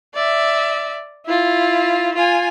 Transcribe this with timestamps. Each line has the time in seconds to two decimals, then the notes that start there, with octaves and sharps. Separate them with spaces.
0.14 D5 E5
1.26 E4 F4
2.15 F4 G#5